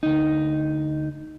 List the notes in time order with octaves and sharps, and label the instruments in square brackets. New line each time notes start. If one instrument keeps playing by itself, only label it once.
[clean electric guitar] D2 D#4